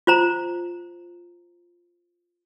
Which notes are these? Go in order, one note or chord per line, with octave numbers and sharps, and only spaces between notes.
F4 C5 A#5